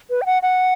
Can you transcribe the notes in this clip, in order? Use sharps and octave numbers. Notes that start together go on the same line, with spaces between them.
B4
G5
F#5
F#5